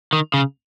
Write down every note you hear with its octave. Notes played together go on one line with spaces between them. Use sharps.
D#3
C#3